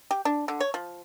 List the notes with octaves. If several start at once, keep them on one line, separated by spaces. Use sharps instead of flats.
G4
D4
D3
C#5
F3